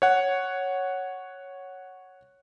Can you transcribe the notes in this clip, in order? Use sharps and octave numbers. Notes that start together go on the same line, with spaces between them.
C#5 F#5